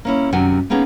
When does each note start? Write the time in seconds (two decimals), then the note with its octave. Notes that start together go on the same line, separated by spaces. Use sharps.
0.05 A#3 C#4 E4
0.33 F#2 C3 D#3 F#5 G#5
0.70 A#3 B3 C#4 D#4 G#4